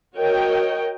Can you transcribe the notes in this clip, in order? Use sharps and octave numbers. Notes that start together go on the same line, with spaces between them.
F#4 A#4 C#5 D#5 G5